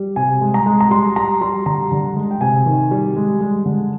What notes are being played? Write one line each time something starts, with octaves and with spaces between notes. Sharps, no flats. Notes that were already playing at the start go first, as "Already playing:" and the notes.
Already playing: G3
C3 G#5
G#3
A#5
G#3
A#5
G3 C6
G3 A#5
G3 C6
D3 A#5
D3
G#3
G5
C3 G#5
D#3
G3
G#3
G#3
D3